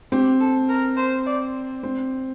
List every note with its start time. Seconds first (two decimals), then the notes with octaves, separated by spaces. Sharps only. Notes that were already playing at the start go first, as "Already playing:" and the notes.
0.12 C4 G4
0.40 A4
0.69 A#4
0.97 C5
1.26 D5
1.83 C4